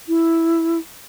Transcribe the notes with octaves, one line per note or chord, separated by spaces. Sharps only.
E4